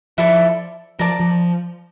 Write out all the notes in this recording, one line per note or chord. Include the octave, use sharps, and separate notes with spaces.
F3 E4 A4 D5
F3 A#4 D5 A5 D6
F3